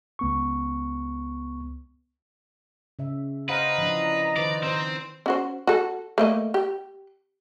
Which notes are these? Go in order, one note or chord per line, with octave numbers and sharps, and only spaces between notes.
C#2 B3 C#6
C#3 E5
B4 C5 D#5 F5 F#5 A#5
E3 F3 D4
D#3 B4 C5 D5
D#3 C4 C5
C#4 F#4 C5
F#4 A4
A3 A#3 D#5
G4